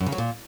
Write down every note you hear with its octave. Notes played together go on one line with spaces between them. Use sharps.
F#2
C#3
F#3
A#2